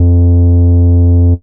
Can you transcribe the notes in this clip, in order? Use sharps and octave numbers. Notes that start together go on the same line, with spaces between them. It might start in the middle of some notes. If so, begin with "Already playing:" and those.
Already playing: F2